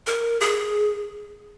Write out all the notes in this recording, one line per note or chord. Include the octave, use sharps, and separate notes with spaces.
A#4
G#4